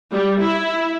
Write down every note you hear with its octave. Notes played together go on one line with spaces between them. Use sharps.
G3
E4